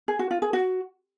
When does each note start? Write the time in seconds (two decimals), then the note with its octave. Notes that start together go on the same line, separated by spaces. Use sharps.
0.08 G#4
0.19 F#4
0.31 F4
0.42 G#4
0.53 F#4